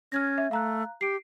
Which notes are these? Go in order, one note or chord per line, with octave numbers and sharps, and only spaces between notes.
C#4 F6 G#6 A#6
E5
A3 F5 A#5 F#6
G4 C7 D7